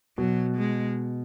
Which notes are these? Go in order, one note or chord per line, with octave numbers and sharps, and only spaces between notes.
B2 F#3
G#3